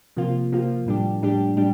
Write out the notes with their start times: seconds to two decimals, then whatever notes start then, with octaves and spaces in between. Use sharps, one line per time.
0.17 C3 F3 A#3 F4
0.52 C3 F3 A#3 F4
0.86 A2 G3 D4 G4
1.22 A2 G3 D4 G4
1.57 A2 G3 D4 G4